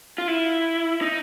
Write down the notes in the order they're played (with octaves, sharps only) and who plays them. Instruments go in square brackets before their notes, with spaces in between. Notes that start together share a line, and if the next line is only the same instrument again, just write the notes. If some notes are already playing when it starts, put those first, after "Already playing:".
[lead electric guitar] F4
E4
D#4